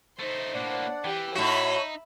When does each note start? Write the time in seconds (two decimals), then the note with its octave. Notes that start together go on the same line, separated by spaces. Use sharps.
0.19 A3 D#4 C5
0.54 A2 A#3 D4 D5 F#5
1.05 E3 G4
1.35 A2 D#4 F#4 C#5 E5 B5